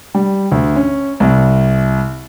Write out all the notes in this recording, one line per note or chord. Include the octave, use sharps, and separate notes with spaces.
G3
D2
C#4
C2